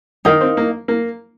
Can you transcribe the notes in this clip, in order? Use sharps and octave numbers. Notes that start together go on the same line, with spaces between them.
D#3 D#4 A#4 F5
C4
A#3
A#3